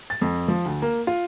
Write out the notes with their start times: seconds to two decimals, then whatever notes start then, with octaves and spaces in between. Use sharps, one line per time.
0.10 A6
0.22 F2
0.48 F3
0.65 D2
0.82 A#3
1.07 F4